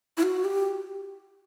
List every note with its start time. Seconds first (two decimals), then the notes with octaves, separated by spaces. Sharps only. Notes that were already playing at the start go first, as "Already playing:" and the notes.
0.17 E4
0.23 F#4
0.45 G4